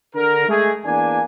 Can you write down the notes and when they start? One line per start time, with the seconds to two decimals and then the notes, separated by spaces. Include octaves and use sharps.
0.15 D3 A#4
0.49 G#3 A3 G#4
0.86 E2 A#3 D4 G#5